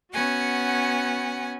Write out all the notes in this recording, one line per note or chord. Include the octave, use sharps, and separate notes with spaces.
B3 C#4 F#4 F#5 G#5